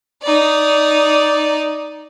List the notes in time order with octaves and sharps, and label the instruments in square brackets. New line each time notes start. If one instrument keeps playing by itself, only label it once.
[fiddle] D#4 D5